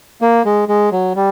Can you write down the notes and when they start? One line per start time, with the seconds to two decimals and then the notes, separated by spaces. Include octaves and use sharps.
0.22 A#3
0.45 G#3
0.68 G#3
0.92 F#3
1.16 G3